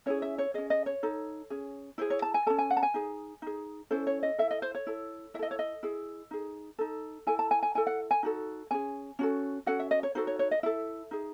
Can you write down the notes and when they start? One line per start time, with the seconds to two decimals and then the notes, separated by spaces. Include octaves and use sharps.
0.06 C#4 E4 G#4 C#5
0.22 E5
0.38 C#5
0.54 C#4 G#4 D#5
0.70 D#5
0.86 C#5
1.03 D#4 A4
1.50 C#4 G#4
1.98 E4 G#4 C5
2.10 C#5
2.22 A5
2.34 G#5
2.46 C#4 F#4 A4 A5
2.58 G#5
2.70 F#5
2.77 A5
2.83 G#5
2.94 D#4 G#4
3.42 D#4 G#4
3.91 C#4 E4 A4 C5
4.07 C#5
4.23 D#5
4.38 E4 A4 E5
4.51 D#5
4.62 C5
4.75 C#5
4.87 E4 A4
5.34 E4 E5
5.39 A4 D#5
5.51 C#5
5.59 D#5
5.83 E4 G#4
6.31 D#4 G#4
6.79 D#4 A4
7.27 E4 A4 G#5
7.39 A5
7.51 G#5
7.63 G#5
7.75 E4 A4 G#5
7.87 F#5
8.11 G#5
8.23 D#4 F#4 A4
8.71 C#4 G#4 G#5
9.19 C#4 F#4 A4
9.66 C#4 F#4 A4 F#5
9.79 E5
9.91 D#5
10.03 C#5
10.15 D#4 F#4 A4 C5
10.27 C#5
10.39 C#5
10.51 D#5
10.63 E4 A4 E5
11.11 D#4 G#4